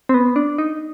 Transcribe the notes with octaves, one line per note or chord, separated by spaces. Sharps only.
C4
B3
D4
D#4